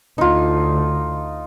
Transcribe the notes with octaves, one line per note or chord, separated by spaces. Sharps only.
D2 D3 D#4 F4